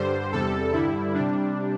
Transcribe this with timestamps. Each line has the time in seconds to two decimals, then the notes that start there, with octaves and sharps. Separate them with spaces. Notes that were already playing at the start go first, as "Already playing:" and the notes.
Already playing: G2 D3 G3 C5
0.32 E2 C3 G3 A4
0.73 G2 D3 G3 E4
1.14 C3 G3 D4